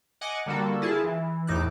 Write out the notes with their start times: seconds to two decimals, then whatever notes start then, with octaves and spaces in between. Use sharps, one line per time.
0.21 D#5 F#5 G#5 D6 A#6 C#7
0.46 D3 G3 A#3 F#4 A4
0.82 E4 F4 G#4 A5
1.04 E3
1.47 E2 A2 D#4 D6 E6 F#6